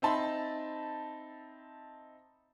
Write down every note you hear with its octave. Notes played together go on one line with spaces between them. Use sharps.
C4 D#4 E5 A5 B5 C6